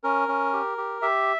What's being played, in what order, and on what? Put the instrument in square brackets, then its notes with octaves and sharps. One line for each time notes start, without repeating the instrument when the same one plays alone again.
[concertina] C#4 A#4
C#4
G4
G4
G4 E5